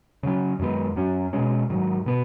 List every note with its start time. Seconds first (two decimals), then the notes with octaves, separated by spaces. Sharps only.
0.23 C#3 F#3 C#4
0.59 F#2 D#3 G#3 B3
0.96 F#2 F#3 C#4
1.33 B2 G#3 C#4
1.70 G#2 D#3 F#3
2.06 B2 B3